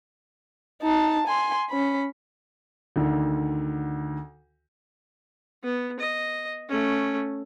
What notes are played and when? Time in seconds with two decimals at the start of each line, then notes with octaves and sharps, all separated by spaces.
0.82 D#4 A5
1.27 G#5 C6
1.70 C#4 B5
2.96 D2 D3 D#3
5.64 B3
6.00 D#5
6.69 A3 C#4